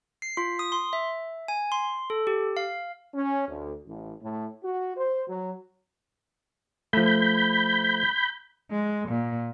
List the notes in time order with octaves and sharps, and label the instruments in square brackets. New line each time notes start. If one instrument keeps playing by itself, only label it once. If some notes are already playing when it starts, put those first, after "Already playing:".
[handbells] C7
F4
D#6
C6
E5
G#5
C6
A4
G4
F5
[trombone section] C#4
D2
A1
A2
F#4
C5
F#3
[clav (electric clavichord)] F3 A3 [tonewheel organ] B5 G6
[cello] G#3
A#2